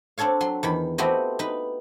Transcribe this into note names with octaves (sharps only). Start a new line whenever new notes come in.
C4 D4 A4 C#5 F5
F#3 C6
E2 D#3 B5
A3 C4 F#4 G4 B4 D#5
D#4 B4